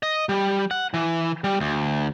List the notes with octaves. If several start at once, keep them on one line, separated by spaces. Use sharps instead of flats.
D#5
G3
F#5
E3
G3
D2